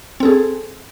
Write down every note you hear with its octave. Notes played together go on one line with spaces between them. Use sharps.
C4 G#4 A4